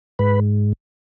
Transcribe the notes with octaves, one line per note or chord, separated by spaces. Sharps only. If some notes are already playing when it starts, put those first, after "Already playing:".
G#2 B4